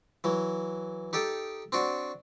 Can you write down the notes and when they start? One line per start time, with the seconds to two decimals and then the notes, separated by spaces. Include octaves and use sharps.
0.24 E3 F#3
1.13 D#4 G4 A4 G5
1.72 C4 D4 F#4